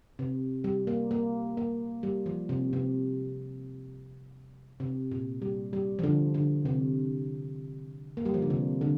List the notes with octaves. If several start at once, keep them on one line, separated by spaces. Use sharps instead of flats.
C3
G3
A#3
A#3
A#3
G3
F3
C3
C3
C3
A#2
G3
G3
F3
D3
D3
C3
A#3
G3
F3
D3
C3
D3